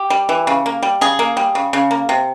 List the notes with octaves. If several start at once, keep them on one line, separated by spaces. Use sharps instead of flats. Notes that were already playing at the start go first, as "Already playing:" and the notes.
Already playing: G4
G3
E3
C#3
A#3
G3
C#3 G#4
A#3
G3
C#3
C#3
A#3
C3